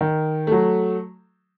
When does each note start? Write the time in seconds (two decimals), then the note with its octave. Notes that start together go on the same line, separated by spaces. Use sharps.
0.01 D#3
0.47 F#3 A3